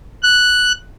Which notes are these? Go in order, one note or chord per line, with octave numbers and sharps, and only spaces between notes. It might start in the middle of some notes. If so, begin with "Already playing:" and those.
F#6